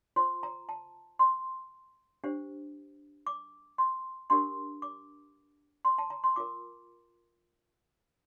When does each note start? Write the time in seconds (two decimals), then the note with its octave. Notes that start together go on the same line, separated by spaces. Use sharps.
0.16 F4 C5 C6
0.43 A#5
0.69 A5
1.19 C6
2.24 D4 G4 C5
3.27 D6
3.78 C6
4.30 D4 G4 A#4 C6
4.82 D6
5.85 C6
5.98 A5
6.10 A#5
6.24 C6
6.36 F4 A#4 D6